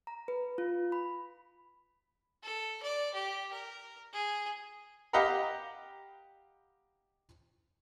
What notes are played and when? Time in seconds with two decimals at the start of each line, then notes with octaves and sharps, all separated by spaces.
0.07 A#5
0.28 B4
0.58 F4
0.92 B5
2.43 A4
2.83 D5
3.14 G4
3.53 A#4
4.14 G#4
5.13 G4 D#5 F5 F#5 A#5 B5